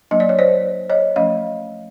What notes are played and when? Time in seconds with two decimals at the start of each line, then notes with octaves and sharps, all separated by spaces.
0.11 F#3 A#3 D4 D#5
0.20 D5
0.29 C#5
0.39 C5 D5
0.90 C#5 D#5
1.16 F3 A3 C#4 D#5 F5